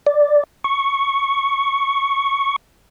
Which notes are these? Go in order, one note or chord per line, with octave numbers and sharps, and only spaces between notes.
D5
C#6